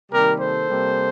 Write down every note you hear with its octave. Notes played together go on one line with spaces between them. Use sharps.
C3 D#3 G3 A#3 G4 A#4
A4 C5
C3 G3 A#3